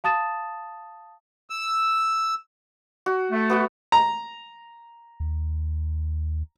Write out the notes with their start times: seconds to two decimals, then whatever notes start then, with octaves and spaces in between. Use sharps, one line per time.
0.04 F5 A5 D#6 A6 E7
1.50 E6
3.06 F#4
3.31 A3
3.50 B3 F#4 F#5
3.92 A#5
5.20 D#2